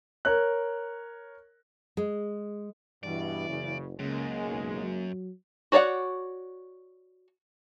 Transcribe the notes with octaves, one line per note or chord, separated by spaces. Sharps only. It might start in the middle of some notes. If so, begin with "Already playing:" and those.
A#4 C#5 F#6
G#3
G2 B2 E3 D5
F#1 C#3
C#2 F#2 C#3 G#3 A#3
B1
F#3
F#4 C#5 D5 F5 F#5